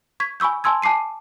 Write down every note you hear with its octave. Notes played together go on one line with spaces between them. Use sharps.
C#6 G#6 B6
G#5 B5 C#6 E6 G6
G#5 A5 C6 E6 G#6
G#5 A5 D6 C7 D#7